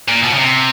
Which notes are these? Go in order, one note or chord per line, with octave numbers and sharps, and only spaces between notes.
A#2
B2
C#3
C3